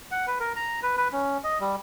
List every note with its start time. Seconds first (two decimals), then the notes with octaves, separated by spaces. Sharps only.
0.11 F#5
0.27 B4
0.40 A#4
0.56 A#5
0.83 B4
0.97 B4
1.12 C#4
1.44 D#5
1.60 G3